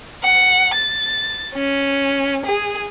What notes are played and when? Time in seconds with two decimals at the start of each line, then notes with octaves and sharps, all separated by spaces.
0.23 F#5
0.75 A6
1.55 C#4
2.45 G#4